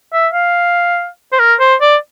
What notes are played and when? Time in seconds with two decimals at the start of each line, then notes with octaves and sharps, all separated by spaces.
0.13 E5
0.34 F5
1.33 C5
1.40 A#4
1.60 C5
1.81 D5